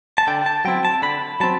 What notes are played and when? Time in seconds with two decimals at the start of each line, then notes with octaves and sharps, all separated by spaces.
0.18 A5
0.27 D3 G5
0.46 A5
0.65 F#3 C4 E4 G5
0.85 A5
1.02 D3 B5
1.40 F#3 C4 A5